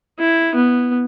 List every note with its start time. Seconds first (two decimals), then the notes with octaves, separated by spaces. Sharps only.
0.19 E4
0.55 B3